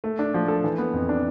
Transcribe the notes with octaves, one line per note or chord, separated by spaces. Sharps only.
A3
D4
F3
A4
E3
B3
F2
D4